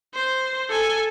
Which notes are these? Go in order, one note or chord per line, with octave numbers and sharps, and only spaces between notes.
C5
A4 G#5